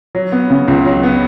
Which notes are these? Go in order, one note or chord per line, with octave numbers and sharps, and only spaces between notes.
F#3
B3
C#3
C#2
F#3
B3